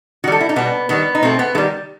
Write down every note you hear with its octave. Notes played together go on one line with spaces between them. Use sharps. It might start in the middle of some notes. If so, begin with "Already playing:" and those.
D#3 G3 F#4 A4
E4
D#4
B2 G3 B3
D#3 G3 B3
D#4
B2 A3 C4
B3
D#3 G3 A3